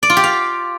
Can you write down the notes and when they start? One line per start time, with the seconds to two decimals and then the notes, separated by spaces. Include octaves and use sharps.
0.03 D5
0.10 F4
0.17 G4
0.24 F5